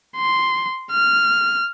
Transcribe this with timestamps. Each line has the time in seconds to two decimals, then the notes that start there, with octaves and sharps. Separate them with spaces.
0.17 C6
0.91 F6